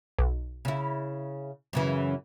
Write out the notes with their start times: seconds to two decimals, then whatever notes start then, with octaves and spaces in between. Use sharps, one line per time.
0.19 B1
0.65 C#3 E4
1.73 F#2 C#3 E3